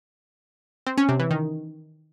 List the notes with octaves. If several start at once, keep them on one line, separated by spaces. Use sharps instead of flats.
C4
C#4
C3
E3
D#3